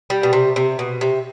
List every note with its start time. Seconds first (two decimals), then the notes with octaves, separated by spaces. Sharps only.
0.10 G3
0.23 B2
0.33 C3
0.56 C3
0.79 B2
1.01 C3